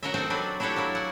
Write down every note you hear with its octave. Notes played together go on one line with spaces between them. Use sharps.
F#4 A#4 C#5 D#5 E5
C4 D#4 F#4 A4 C5
F#3 D4 B4 G#5
D4 E4 F#4 G4 A4 C#5
F#3 A#3 E4
F#5 G#5